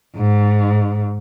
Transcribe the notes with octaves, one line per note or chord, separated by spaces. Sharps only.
G#2